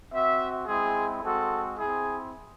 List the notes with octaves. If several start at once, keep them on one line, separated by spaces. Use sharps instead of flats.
C4 F#4 E5
G#3 C4 E4 G#4
G#3 C4 F#4 A4
C4 E4 G#4